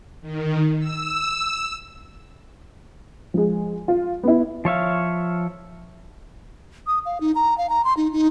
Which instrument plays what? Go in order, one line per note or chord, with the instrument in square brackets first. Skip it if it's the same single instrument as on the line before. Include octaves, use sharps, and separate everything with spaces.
[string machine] D#3
E6
[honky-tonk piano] F3 G#3
F4
B3 E4
[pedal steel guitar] F3 C#5 E5 F5
[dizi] D#6
F5
D#4
A#5
F5
A#5
C6
D#4
D#4